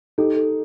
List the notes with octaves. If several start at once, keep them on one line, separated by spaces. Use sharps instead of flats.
D#4 G4 A4
A4